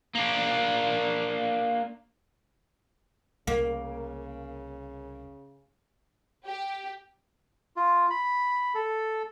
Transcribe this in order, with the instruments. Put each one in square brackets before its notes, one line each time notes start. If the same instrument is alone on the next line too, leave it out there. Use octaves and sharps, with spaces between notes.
[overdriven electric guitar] A#3 D4
[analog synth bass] C2 [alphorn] C#3 [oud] A#3
[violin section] G4
[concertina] F4
B5
A4